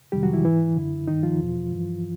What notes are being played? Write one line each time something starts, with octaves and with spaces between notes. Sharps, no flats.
F2 C3 D#3 G3 G4
F#3 F#4
E3 E4
G#2 E3 E4
F#2 D3
G2 D#3 D#4
F3 F4
E2 B2
G2 E3